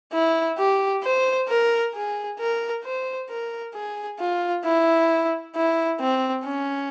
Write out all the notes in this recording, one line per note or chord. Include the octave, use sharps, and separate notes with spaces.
E4
G4
C5
A#4
G#4
A#4
C5
A#4
G#4
F4
E4
E4
C4
C#4